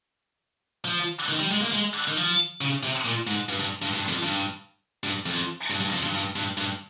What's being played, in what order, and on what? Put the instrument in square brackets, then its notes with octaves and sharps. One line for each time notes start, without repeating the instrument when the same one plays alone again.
[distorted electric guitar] F3
D#3
G3
G#3
A#3
G#3
D#3
F3
C#3
C3
A#2
G#2
G2
G2
G2
G2
F2
G2
G2
F2
G2
G2
F2
G2
G2
G2
G2